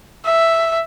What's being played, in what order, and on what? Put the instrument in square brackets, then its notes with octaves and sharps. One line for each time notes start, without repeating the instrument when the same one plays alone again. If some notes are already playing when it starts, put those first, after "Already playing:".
[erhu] E5